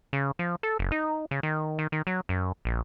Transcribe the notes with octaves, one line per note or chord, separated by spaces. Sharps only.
C#3
F3
A4
F#1
D#4
C#3
D#3
D#3
D#3
F#3
F#2
A#1